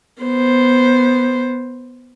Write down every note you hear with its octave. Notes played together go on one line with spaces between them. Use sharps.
B3 C5